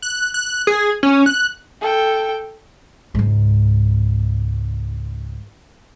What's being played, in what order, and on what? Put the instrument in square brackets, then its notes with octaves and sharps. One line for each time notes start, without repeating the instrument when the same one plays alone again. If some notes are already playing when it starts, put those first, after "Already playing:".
[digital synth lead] F#6
F#6
G#4
C#4
F#6
[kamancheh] A4 G5
[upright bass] C#2 G#2